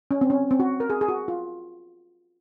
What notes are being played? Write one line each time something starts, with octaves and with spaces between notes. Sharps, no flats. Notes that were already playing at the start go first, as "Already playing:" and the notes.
C#4
C4
C#4
C4
F#4
A#4
G#4
G#4
F#4
F4